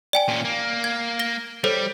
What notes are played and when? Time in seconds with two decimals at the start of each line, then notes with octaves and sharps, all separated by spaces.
0.13 D5 G5 G#5
0.28 A#2 C#4
0.45 A#3
0.84 G#6
1.19 A#6 G7
1.64 G3 A4 C5 C#5